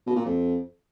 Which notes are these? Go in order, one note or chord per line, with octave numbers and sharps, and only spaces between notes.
B2
A#2
F2